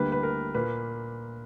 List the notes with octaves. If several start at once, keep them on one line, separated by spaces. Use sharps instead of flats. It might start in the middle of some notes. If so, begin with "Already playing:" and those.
Already playing: D2 D3 G3 A#3 B4
B4
A#4
A#2 A#3 B4